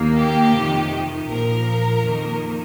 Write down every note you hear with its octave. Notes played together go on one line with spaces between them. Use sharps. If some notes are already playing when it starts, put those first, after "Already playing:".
Already playing: D#2 D#3 A#3
G4
F2 C3 D#3
A#1 A#2 F3 A#4
F2 D#3 A#3